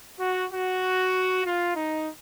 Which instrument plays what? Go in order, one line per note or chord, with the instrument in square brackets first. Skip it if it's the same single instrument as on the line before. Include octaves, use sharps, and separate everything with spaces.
[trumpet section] F#4
F#4
F4
D#4